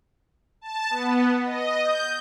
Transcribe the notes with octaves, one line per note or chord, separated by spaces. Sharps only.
A5
B3
D#5
G6